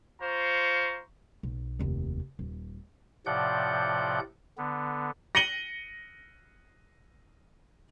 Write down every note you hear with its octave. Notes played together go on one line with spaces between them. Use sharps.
F4 C5 A#5 C#6
B1
F1 D#2
D#1
A2 C3 F3 D5 F#5 G6
D3 B3
A#6 C#7 D#7 F#7 G7